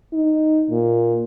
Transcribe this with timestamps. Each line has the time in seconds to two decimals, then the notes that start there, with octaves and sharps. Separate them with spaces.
0.13 D#4
0.70 A#2